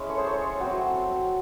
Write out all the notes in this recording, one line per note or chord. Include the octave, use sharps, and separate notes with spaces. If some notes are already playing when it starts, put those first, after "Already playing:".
Already playing: G#3 C#4 E4
A4 C#5
G#4 C5
A4 C#5
F#3 C4 E4